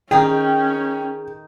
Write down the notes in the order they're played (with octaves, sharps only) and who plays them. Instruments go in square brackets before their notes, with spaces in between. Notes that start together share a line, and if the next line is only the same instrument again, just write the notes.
[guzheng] D#3 D#4 A#4 [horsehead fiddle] C#4 [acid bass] G#4 [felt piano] G5